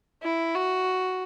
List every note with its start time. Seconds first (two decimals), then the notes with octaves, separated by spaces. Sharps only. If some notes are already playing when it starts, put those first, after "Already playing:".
0.23 E4
0.55 F#4